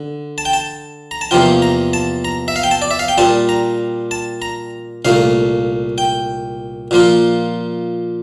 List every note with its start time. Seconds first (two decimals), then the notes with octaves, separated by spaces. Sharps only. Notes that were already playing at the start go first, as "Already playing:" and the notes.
Already playing: D3
0.38 A5
0.45 G5
0.53 A5
1.11 A#5
1.21 A5
1.31 E2 C3 F3 A#3 F4 G5
1.62 A#5
1.93 A5
2.25 A#5
2.48 E5
2.56 F5
2.63 G5
2.71 A5
2.82 D5
2.91 E5
2.99 F5
3.08 G5
3.18 A#2 G3 C4 A5
3.49 A#5
4.11 A5
4.42 A#5
5.05 C2 A#2 A3 F5
5.98 G5
6.91 A#2 F3 A#3 F4